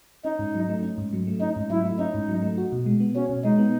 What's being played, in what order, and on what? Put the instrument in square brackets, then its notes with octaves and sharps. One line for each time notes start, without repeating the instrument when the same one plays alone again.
[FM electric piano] C#4 [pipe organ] D#4
[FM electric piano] G#2
F#3
A3
C#4
G#2
F#3
A3
[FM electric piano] C#4 [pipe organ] D#4
[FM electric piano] G#2
[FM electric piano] F#3 [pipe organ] E4
[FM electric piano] A3
[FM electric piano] C#4 [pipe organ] D#4
[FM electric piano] G#2
F#3
A3
F#4
B2
G#3
B3
[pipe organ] C#4 [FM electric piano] F#4
[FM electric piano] B2
[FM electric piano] G#3 [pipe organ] D#4
[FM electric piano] B3